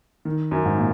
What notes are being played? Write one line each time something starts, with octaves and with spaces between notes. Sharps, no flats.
D#3
F#2
G#2
A#2